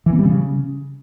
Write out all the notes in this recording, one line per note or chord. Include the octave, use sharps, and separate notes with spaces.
E3
B3
G3
C#3